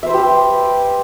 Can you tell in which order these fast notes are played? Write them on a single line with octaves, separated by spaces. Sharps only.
E5 C5 B4 G4